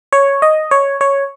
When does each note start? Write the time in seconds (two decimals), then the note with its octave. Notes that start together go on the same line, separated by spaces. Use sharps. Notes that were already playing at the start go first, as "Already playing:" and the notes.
0.13 C#5
0.42 D#5
0.71 C#5
1.01 C#5